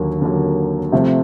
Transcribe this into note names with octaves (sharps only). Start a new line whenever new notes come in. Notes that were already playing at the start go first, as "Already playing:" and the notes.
Already playing: D#2 D3 F#3 A#3
D#2 D3 F#3 A#3
C3 F3 A3 C4